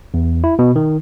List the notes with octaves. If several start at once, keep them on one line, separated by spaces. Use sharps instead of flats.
E2
E4
B2
D#3